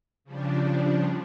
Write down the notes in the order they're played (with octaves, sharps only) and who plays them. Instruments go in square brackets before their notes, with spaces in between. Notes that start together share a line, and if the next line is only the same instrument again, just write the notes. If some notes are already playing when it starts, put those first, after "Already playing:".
[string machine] C#3 F3 G3 D4